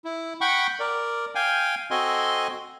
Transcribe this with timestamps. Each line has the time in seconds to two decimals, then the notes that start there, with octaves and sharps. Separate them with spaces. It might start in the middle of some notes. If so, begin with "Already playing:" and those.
0.04 E4
0.41 F#5 G5 B5 C#6
0.79 A#4 D5
1.35 F5 G5 G#5
1.91 C4 F#4 A4 D#5 G#5 C6